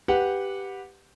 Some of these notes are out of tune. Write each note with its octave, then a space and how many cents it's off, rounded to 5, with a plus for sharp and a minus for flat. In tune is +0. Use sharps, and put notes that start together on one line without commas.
G4 +0 B4 +0 F#5 -10